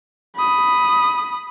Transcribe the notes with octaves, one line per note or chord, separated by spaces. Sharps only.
B5 D#6